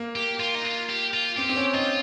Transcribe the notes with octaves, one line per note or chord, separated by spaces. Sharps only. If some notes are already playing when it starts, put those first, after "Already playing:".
Already playing: A#3
G4
F4
D#4
F4
G4
F4
C4 G4
C4
C#4
D#4 F4